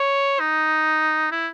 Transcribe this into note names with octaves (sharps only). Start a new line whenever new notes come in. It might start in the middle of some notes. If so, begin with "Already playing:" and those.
Already playing: C#5
D#4
E4